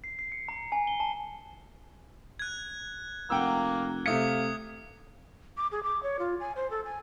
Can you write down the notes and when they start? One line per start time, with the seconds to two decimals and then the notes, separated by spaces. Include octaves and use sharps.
0.04 C7
0.19 C7
0.32 C#7
0.48 A#5
0.72 G#5
0.87 G7
1.00 A5
2.39 F#6 G#6
3.30 F1 A#3 F#5 G5 E6
4.06 C3 A3 F5 D#6 G#6 C#7
5.57 D6
5.72 G#4
5.83 D6
6.03 C#5
6.19 F4
6.40 G#5
6.56 C5
6.70 A4
6.85 G#5